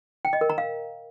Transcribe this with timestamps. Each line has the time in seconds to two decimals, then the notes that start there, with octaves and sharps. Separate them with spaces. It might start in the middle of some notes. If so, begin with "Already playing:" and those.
0.25 G5
0.33 D#5
0.41 A#4
0.50 A#5
0.58 F5